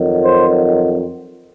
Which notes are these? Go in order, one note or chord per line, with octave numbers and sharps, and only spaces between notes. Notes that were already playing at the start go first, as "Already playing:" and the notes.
Already playing: F2 D#3 F#3
C5